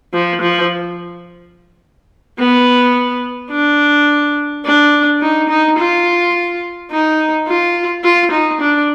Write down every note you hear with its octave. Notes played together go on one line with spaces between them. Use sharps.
F3
F3
B3
D4
D4
D#4
D#4
F4
D#4
F4
F4
D#4
D4